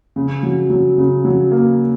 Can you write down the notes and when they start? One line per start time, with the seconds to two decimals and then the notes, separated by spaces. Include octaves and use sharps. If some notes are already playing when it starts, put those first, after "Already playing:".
0.16 C#3
0.43 F#3
0.70 F#3
0.98 C#3
1.25 F#3
1.52 A#3